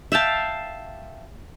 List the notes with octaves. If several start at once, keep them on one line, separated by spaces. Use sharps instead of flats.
E5 F5 G5 A5